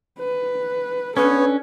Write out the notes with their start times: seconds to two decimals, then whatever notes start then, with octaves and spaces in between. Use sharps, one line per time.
0.19 B4
1.17 B3 C#4 D4 A4 B4 C#5